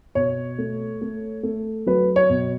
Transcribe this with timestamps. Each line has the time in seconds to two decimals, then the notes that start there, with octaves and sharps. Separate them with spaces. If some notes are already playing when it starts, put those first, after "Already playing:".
0.15 B2 C#5
0.58 A3
1.01 A3
1.43 A3
1.87 F#3 B4
2.16 C#5
2.30 B2